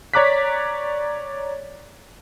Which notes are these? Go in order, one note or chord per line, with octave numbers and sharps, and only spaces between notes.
C#5 D5 A#5 D6 F#6 B6